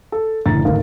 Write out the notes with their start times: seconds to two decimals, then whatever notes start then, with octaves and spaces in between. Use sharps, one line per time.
0.12 A4
0.46 F#1 A2 D3 E3 A#5 A6
0.65 G#1 D2 A#4 F5